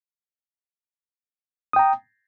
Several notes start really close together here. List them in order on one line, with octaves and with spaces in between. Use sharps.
D#6 G5 A#5